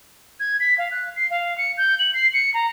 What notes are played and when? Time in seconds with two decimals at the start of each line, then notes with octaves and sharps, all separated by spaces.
0.40 G#6
0.60 B6
0.78 F5
0.91 F#6
1.16 C7
1.30 F5
1.58 C#7
1.78 G6
1.99 F#7
2.14 C7
2.33 C#7
2.54 A#5